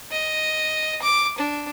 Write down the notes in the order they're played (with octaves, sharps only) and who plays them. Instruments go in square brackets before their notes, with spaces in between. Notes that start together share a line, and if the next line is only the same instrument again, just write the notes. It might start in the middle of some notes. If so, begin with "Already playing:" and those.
[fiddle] D#5
D6
D4